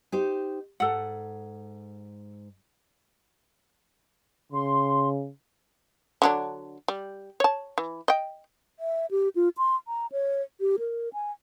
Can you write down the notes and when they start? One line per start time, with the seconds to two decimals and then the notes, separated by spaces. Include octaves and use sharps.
0.12 D#4 G4 C5
0.80 G#2 A4 F#5
4.52 C#3 C6
6.22 D3 F#3 D4
6.88 G3
7.40 C#5 A5
7.78 E3
8.08 D#5 G5
8.79 E5
9.11 G4
9.36 F4
9.57 C6
9.87 A#5
10.12 C#5
10.60 G4
10.79 A#4
11.13 G#5